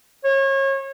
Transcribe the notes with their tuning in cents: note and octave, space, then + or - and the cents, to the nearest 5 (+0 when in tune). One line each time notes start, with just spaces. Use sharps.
C#5 -30